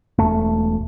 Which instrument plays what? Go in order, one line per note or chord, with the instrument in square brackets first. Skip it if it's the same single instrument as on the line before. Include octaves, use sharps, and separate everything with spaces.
[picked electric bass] E1 A3